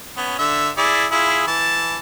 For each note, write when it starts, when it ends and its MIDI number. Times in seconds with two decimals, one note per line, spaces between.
0.17 0.34 59
0.17 0.34 61
0.39 0.69 50
0.39 0.69 76
0.78 1.06 64
0.78 1.06 68
0.78 1.06 74
1.12 1.44 64
1.12 1.44 65
1.12 1.44 68
1.47 1.98 52
1.47 1.98 81